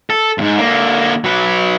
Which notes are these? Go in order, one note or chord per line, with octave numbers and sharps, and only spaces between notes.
A4
D#2 G#2
D3 A#3
F#3 B4